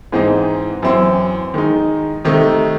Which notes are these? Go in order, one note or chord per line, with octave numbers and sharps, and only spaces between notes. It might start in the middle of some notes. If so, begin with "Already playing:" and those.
G#2 E3 C4 D#4
F#2 E3 C4 E4
D#3 G#3 D#4
C3 D#3 A3 D#4